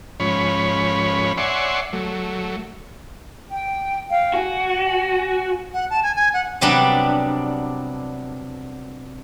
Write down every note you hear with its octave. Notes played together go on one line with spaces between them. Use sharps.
G#2 F3 C#4 C#5 B5
C#5 D5 E5 F#5 G#5 C6
F#3 A3
G5
F5 G5
F#4 G#5
F#5
A5
G#5
G#5
F#5
C3 F#3 G3 B3 D4